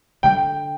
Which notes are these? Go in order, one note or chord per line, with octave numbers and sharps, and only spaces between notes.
D3 G3 G5